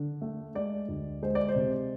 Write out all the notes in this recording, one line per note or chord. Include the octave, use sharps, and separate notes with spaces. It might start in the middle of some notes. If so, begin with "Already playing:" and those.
Already playing: D3
A3
G#3 D5
D2
G#3 C5
D5
C5
C3